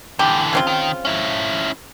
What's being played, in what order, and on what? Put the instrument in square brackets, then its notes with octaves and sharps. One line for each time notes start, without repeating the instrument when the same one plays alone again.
[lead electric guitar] D3 E3 [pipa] G4
[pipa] C#3 C4 F4
[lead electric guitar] D#3
C#4 E4